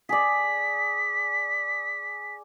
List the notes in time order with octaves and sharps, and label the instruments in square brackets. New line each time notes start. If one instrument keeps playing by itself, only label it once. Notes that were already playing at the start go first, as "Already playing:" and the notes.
[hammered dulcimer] G#4 D5 [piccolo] B6